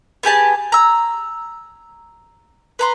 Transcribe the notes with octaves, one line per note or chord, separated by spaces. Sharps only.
B3 G4 G#4 A5
A#5 E6
B4 A#5 C6